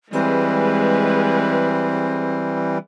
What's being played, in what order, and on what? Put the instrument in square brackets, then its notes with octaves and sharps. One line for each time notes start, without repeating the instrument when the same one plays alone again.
[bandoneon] E3 G3 [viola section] G#3 G#4 B4 [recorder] C4